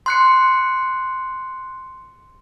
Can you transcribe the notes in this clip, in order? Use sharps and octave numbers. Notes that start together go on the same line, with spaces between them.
C6 F#6 C#7